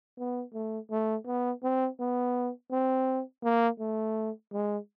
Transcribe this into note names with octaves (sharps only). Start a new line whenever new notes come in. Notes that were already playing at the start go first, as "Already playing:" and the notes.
B3
A3
A3
B3
C4
B3
C4
A#3
A3
G#3